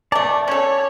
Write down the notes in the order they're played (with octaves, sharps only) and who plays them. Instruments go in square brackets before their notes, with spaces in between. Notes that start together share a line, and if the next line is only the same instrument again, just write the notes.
[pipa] A3 A5 [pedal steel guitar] D5
[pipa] C#4 F#4 A4 [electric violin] C#5